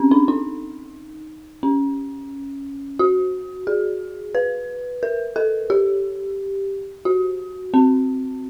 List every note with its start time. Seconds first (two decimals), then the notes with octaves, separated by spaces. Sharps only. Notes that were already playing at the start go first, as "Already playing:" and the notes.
Already playing: C4 C#4
0.11 D4
0.28 D#4
1.63 C#4
2.99 F#4
3.67 G#4
4.35 B4
5.03 A#4
5.36 A4
5.70 G4
7.05 F#4
7.74 C4